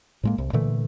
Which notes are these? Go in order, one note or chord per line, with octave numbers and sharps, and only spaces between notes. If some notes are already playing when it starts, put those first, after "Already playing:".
A2 G#3 A#3
C2
A#2 D3 E3 A3